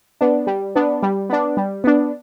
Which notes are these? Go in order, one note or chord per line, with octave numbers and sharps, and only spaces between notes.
B3 D4
G3
B3 D4
G3
B3 D4
G3
B3 D4